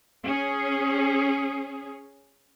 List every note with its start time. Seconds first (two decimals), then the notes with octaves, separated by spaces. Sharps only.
0.24 C#4 G#4